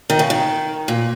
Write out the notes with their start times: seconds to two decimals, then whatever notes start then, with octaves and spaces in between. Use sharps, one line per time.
0.10 D#3
0.19 C#3
0.30 D#3
0.88 A#2